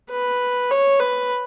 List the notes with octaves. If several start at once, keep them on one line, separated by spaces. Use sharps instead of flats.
B4
C#5
B4